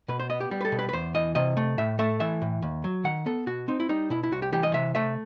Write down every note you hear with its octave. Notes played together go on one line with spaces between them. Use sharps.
B2 B4
C5
B3 D#5
G4
G3
B4
A4
B2
B4
B4
E2 C5
E3 D#5
C3 D#5
A3
A2 E5
A3 E5
E3 E5
A2
D#2
F#3
D#3 F#5
B3 A4
B2 F#4
C4 D#4
E4
G3 D#4
B2 E4
E4
C2 F#4
G4
E3 G4
D#5
C3 E5
A3 E5